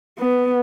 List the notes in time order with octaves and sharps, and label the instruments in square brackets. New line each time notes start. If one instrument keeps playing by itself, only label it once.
[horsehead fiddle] B3